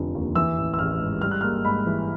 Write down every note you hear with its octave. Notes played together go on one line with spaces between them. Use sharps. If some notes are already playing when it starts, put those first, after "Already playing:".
Already playing: F1 D3 F3
D#2
E3 E6
A1
E6
A1 F6
G#2
G3 F6
F#6
A#3 F6
G#2 B5
E3